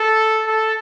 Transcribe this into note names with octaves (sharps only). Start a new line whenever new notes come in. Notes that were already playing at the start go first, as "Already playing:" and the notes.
Already playing: A4
A4